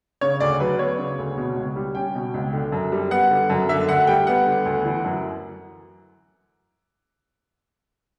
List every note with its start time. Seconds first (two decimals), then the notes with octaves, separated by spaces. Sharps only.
0.21 C#3 C#5
0.40 D2 D5
0.60 F#3 B4
0.79 B3 C#5
0.98 C#3
1.19 D2
1.37 B2
1.56 C#2
1.76 G3
1.95 C#4 G5
2.15 B2
2.34 C#2
2.53 D3
2.72 F#2
2.92 G3
3.11 B3 F#5
3.30 D3
3.50 F#2
3.69 D3 E5
3.89 D2 F#5
4.07 G3 G5
4.27 B3 F#5
4.46 D3
4.66 D2
4.85 E3
5.05 F#2